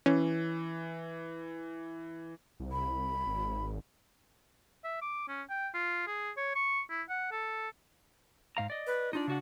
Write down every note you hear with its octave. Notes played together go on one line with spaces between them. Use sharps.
E3 C#4
C2
B5
G#1
E5
D6
C#4
G5
F4
G#4
C#5
C#6
E4
F#5
A4
G#2 F5 A#5
D5 D#5
B4
D4 D#4 F4 D5
C#3 F#4 F#5